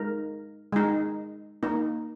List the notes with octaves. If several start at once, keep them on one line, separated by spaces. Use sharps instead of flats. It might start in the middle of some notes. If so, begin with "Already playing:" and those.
Already playing: G#3 D#4 A#4
G#3 D#4
A#3 D#4